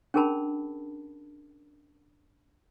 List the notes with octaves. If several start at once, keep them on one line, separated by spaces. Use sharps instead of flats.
C#4 D4 G#4 A#4 A5 B5